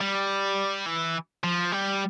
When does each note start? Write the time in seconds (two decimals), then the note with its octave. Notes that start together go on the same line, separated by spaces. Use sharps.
0.01 G3
0.86 E3
1.44 F3
1.72 G3